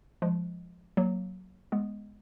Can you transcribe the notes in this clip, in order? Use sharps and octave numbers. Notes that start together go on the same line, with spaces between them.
F3 G#3
F#3 A#3
G#3 B3